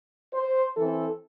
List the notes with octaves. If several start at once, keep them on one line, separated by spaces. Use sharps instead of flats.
C5
E3 C4 A4